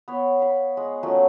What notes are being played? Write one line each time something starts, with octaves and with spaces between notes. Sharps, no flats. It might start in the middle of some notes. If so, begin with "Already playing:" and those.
B3 C#5
F5 B5
G#3
F3 F#3 A3 C#4